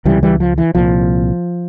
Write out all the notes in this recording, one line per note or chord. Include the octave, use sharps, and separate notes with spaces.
C#2 C3 E3 G3
E3 G3
F3
E3
C2 A#2 F3